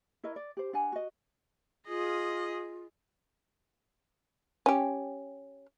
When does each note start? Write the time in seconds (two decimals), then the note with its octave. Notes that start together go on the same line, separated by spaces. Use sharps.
0.24 E4 A#4 C#5 D#5
0.36 D5
0.57 G4 C5
0.73 D4 F#5 G#5
0.92 F#4 D#5
1.88 F4 G#4 D#5
4.66 C#4 G4